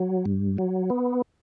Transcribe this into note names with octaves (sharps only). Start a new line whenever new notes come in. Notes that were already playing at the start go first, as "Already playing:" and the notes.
Already playing: F#3
G2
F#3
B3